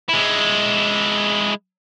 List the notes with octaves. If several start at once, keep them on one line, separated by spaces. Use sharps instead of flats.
G#3 E4